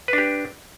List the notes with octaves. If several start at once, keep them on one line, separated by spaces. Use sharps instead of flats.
D4 G4 B4